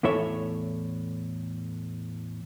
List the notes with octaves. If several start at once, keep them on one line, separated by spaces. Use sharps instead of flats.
E2 A2 E4 A4 C#5 E5